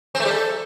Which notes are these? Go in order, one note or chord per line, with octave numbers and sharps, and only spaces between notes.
C4
A3
G3
A4